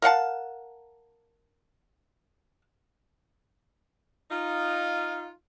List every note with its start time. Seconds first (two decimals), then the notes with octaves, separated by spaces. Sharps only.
0.02 A#4 F5 F#5 A5
4.31 D#4 F4 F5